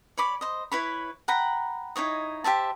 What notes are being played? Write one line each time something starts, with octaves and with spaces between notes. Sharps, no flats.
C#5 D5 B5 D6
C5 D#5
E4 B4 C#5 B5
F#5 G5 A#5 B5
D#4 E4 C#5 D#5
G4 C5 E5 A5